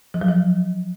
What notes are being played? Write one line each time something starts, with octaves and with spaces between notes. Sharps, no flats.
F3
F#3
F3